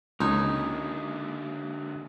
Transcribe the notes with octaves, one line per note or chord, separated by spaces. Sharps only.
C#2 D3 A#3 D#4 C#5